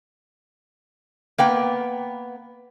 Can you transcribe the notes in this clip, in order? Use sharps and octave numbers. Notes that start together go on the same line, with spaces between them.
A#3 B3 G5